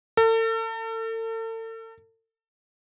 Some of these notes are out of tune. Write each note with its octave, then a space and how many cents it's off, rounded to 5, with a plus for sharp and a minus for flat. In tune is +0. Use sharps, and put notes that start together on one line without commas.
A4 +40